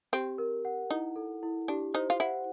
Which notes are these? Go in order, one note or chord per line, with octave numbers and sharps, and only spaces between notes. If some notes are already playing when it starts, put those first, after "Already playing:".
C4 G4
A#4
F#5
D#4 E4
A4
E4
D4 G4
D#4 C5
F4
E4 F#5